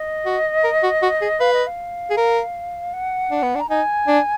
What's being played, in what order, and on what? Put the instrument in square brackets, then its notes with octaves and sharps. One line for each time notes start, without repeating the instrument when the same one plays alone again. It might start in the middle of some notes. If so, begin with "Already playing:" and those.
Already playing: [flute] D#5
[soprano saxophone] F#4
A#4
F#4
F#4
G#4
[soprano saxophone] B4 [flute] F5
[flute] D#5
F5
[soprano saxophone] G#4
A#4
[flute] F#5
[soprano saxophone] D4
B3
D4
[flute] A#5
[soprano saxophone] D#4 [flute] G#5
[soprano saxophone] D4